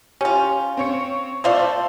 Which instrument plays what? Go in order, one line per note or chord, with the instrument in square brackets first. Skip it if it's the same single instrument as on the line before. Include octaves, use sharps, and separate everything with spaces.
[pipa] C#4 F4 [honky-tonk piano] G4
[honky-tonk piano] C4 C#5 C#7
[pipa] A3 F4 F5 [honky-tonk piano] C5 D5